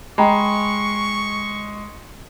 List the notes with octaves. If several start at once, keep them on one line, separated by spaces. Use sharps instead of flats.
G#3 G5 A#5 B5 C#6